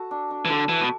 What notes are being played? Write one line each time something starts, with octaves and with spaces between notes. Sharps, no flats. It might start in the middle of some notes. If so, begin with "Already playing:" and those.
Already playing: F#4 A4
D4
D4
E3
D3 A4
E3 F#4
B2